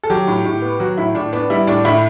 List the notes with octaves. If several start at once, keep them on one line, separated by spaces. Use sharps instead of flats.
A4
F#3 G4
A2
A2
B3
F#3 F#4
A2 E4
A2 D4
B3 D4
G3 E4
A2 D4
A2 E4